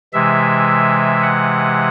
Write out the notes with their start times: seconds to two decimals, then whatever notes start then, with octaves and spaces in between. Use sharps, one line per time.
0.13 C3 E3 G#3 E5
1.23 F#5